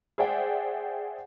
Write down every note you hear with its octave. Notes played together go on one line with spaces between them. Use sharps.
G#4 C5 D5 E5 F#5 G5